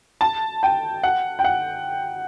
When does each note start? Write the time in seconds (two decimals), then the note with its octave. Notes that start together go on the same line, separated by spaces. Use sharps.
0.21 A5
0.63 G5
1.03 F#5
1.39 G5
1.44 F#5